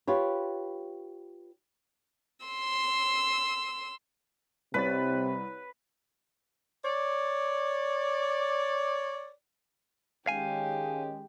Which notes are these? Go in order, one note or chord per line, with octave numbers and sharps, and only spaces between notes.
F4 G4 B4 C#5
C6 E6
C2 C3 B4 C#5 A6
C#5 D5
D#3 G#3 C#4 G4 F5 G#5